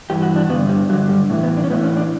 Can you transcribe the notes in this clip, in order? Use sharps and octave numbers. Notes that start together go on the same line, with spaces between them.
G2 E3 G4
F#4
D4
G2 D3 B3
G3
G2 D3 F#3
G3
A2 E3
B3
D4
C#4
A2 E3 B3
C#4
D4